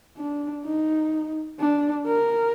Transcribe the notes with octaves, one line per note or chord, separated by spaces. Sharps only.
D4
D#4
D4
A#4